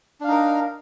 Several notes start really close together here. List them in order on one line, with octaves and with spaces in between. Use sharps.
D4 F5 D#4 A#4